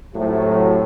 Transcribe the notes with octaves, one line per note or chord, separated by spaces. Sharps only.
A2 C3 F#3